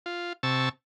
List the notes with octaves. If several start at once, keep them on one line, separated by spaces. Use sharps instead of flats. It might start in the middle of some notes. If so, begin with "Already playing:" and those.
F4
C3 A5 C#6 E6